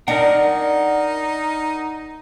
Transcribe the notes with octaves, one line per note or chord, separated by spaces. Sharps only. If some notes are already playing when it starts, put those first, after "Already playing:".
D4 D#4 A#4 D#5 F#5